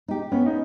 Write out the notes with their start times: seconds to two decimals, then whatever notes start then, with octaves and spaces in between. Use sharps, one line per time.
0.08 D#4 G4
0.32 B3 C#4
0.46 D#4